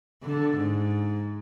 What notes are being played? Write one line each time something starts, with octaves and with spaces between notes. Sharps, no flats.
D3
G#2